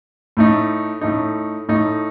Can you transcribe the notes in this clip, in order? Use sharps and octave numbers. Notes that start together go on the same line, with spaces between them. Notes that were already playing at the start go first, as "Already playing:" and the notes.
A2 A3 D#4
A2 A3 D#4
A2 A3 D#4